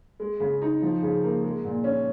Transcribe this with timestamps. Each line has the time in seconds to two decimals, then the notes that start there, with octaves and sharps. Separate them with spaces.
0.20 G#3
0.40 C#3
0.62 D#4
0.82 F3
1.03 C#3
1.24 A#3
1.44 G#3
1.65 A#2
1.84 C#4